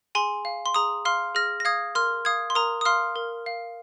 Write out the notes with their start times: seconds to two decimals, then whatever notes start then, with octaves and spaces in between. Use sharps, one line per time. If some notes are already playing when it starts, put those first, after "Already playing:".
0.15 G#4 G#5 C6
0.45 F5
0.66 C6
0.74 G#4 A#5 D#6
1.05 F5 C6 F6
1.35 G#4 F6 A#6
1.60 A#6
1.65 F5 D#6 G#6
1.95 A#4 C6 F6
2.25 F5 D#6 G#6
2.50 C6
2.55 A#4 A#5 D#6
2.81 D#6
2.85 F5 C6 F6
3.16 A#4
3.46 F5